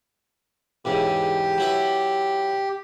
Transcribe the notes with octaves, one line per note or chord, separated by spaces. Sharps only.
E2 G#2 C#3 G4
F#3 E4 B4